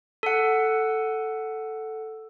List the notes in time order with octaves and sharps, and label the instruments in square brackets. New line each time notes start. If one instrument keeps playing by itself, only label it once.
[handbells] A4 F#5